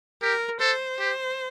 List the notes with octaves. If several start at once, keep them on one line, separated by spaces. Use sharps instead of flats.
G4 A#4
A4 C5
G4